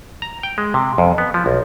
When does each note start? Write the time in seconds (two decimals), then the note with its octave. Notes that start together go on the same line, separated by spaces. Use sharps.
0.22 A#5
0.43 G5
0.58 G#3
0.74 C3
0.98 F2
1.18 B3
1.34 F3
1.46 B1